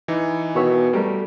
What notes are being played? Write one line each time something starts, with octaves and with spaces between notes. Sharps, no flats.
E3 D#4
B2 D#3 C#5 E5
G3 A3 A#4